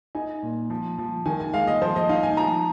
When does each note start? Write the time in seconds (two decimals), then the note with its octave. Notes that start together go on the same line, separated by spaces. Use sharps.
0.15 D#4 G#5
0.43 A#2
0.70 F3
0.98 F3
1.26 D#3 G#5
1.40 G#5
1.53 G#3 F5
1.67 D#5
1.82 F3 C5
1.96 D#5
2.09 D#4 F5
2.23 G#5
2.37 F3 A#5